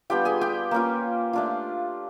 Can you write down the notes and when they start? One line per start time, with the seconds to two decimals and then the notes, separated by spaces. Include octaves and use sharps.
0.10 G3 B3 D4 F4 G4 G5
0.25 G#4 G#5
0.41 G4 G5
0.71 A#3 C#4 F4
1.33 A3 D4 F4